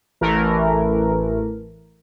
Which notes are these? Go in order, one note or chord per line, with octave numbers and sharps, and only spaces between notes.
A1 E3 A3 A#4